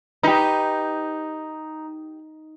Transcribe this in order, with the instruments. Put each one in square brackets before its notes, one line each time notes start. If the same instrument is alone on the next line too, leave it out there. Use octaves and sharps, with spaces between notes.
[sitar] D#4 [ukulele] G4 B4